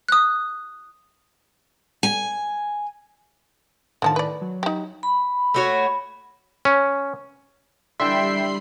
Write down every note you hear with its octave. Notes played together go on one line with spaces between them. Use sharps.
D#6 F#6
G#5
A2 D3 D#3 F3 A5
B4 D5
F#3
D#4 G4
B5
A3 F#4 C#5
C#4
D3 E3 G3 E5 G5 B5 C6 C7